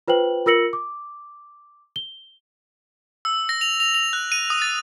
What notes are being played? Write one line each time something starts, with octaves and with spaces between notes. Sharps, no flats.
F4 B4 C5 G5 F#7
F4 A#4 E6 A#6 C#7 F#7
D6
G7
E6
A#6
F7
F7
F7
F#6
D#7
D#6
A6